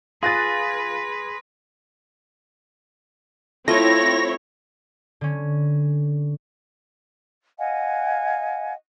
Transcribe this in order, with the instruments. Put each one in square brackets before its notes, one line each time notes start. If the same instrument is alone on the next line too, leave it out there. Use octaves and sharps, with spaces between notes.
[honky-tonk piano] F4 F#6 A6 [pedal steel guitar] G#4 [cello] B4 [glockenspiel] C6 A#6
[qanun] A3 F4 D#5 [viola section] C4 E4 C#5 [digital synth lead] A#6
[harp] D3 C#4
[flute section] D#5 F5 F#5 G#5